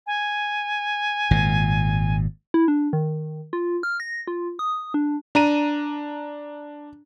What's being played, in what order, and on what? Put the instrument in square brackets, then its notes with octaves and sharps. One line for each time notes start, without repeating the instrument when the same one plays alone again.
[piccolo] G#5
[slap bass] G#1 A#2
[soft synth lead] E4
D4
D#3
F4
F6
A#6
F4
D#6
D4
[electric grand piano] D4 A#5 D#7